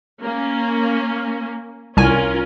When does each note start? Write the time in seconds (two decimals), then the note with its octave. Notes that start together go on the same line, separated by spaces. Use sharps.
0.20 A#3 C#4
1.97 C2 C#4 F4 A#4 G#5